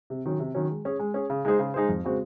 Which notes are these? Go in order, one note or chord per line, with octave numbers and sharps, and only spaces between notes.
C3
D#3 F#3 C#4
C3
D#3 F#3 C#4
G#3
C#4 G#4
G#3
C#4 G#4
C#3
G#3 D#4 G#4 C5
C#3
G#3 D#4 G#4 C5
F2
C#3 G#3 C4 F#4